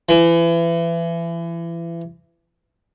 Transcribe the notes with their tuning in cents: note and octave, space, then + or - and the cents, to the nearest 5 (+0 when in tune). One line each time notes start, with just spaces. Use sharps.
E3 +30